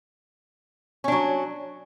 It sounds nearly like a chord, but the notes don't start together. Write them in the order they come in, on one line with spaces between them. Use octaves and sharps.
C#4 D4 F#3